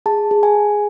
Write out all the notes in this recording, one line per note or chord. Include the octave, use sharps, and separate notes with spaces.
G#4 A5
G#4
G#5
G#4